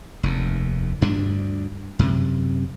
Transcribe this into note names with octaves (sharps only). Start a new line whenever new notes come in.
F1 D#2
D2 G2 D4
F#2 C3